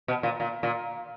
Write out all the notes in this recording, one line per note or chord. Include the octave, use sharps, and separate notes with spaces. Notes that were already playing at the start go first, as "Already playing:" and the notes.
B2
A#2
A#2
A#2